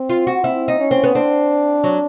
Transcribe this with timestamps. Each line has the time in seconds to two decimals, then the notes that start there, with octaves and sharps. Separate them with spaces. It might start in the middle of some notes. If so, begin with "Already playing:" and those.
Already playing: C4
0.09 F4
0.27 F#4
0.44 C4 E4
0.68 D#4
0.80 C#4
0.91 C4
1.03 B3
1.15 C4 D4
1.84 F#3